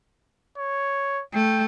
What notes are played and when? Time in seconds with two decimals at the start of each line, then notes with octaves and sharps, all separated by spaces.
0.58 C#5
1.34 A3 G5